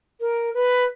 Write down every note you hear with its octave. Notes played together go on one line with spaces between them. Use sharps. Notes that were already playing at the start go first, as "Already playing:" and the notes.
A#4
B4